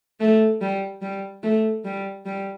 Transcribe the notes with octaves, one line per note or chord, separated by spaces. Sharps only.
A3
G3
G3
A3
G3
G3